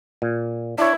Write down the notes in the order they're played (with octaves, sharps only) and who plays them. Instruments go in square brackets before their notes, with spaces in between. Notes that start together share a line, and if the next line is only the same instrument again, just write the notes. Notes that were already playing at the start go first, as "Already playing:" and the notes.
[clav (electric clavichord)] A#2
[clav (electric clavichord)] D4 C#5 [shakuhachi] E4